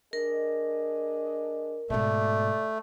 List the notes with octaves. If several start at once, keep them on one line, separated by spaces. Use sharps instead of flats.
D4 G#4 A#4 D#5
G#2 B2 A3 D5